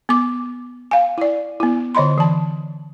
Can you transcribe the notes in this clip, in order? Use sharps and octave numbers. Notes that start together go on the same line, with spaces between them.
B3 D6
F5 G#5
E4 D5
B3 E4
D3 C#5 D#5 B5 C6
E3 A5